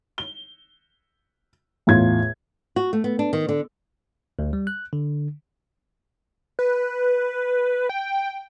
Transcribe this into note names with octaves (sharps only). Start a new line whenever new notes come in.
G7
E2 A2 F4 G#6
F#4
A3
B3
D4
D#3
D3
D2
G3
F#6
D3
B4
G5